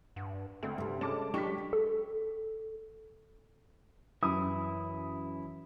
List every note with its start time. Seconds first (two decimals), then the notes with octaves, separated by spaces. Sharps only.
0.16 G2 F#5
0.63 D2 C4
0.78 G2 C3
1.01 G#3 C#4 G#4 A4 A5 D6
1.34 F#3 G#3 D4 G4 C#6 B6
1.73 A4
4.23 F#2 E3 E4 D#6